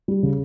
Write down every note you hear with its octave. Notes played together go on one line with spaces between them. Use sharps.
G3
C#3